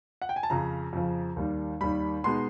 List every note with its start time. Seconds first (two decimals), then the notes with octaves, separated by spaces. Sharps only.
0.22 F#5
0.29 G5
0.36 G#5
0.43 A5
0.50 F2 C#3 F3 A#5
0.93 F2 C#3 F3
1.36 D#2 D#3 G3
1.81 D#2 D#3 G3 B5
2.24 B2 G#3 B3 D#4 C6